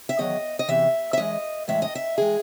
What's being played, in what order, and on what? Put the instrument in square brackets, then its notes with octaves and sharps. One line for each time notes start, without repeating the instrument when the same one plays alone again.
[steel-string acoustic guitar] E5
E2 D#3 F#3 D#5
D#5
E2 C3 E3 E5
E5
F#2 E3 G#3 D#5
A2 E3 G#3 E5
D#5
E5
E3 G#3 G#4